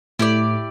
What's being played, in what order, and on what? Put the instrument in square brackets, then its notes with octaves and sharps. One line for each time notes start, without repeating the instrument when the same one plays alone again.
[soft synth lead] A2 [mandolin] E4 G4 D5